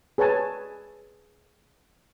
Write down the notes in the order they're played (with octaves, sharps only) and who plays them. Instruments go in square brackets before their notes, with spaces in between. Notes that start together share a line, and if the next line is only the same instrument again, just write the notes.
[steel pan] G#4 B4 C#5 G#5 A5